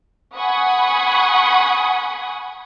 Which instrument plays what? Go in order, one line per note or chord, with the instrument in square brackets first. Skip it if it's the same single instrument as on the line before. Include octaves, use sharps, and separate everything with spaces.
[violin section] F#5 G#5 B5 C#6 D#6